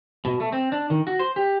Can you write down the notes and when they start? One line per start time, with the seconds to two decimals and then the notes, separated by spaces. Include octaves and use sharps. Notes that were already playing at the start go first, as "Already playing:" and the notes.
0.25 B2
0.40 A3
0.52 C4
0.72 D4
0.90 D#3
1.07 F#4
1.19 C5
1.36 G4